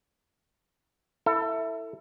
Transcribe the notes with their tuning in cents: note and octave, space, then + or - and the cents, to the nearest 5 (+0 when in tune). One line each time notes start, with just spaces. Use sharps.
E4 +0 A4 +25